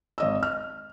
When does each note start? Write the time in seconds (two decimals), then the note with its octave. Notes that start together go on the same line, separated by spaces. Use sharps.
0.18 G#1 D#5 E6
0.43 F6